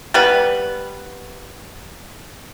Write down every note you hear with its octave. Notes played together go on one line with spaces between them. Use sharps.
G3 B3 B4